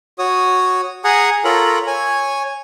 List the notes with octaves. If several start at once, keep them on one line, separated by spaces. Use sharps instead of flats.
F#4 C#5 D#6
G#4 F#5 G#5 A#5 D#6
F4 A4 A#4 C#5 A#5 B5
C#5 G#5